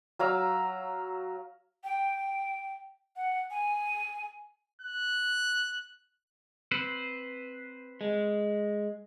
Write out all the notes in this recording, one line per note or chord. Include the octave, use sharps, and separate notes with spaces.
F#3 F5 A#5 E6
G5
F#5
G#5
F#6
C4 B4 C5
G#3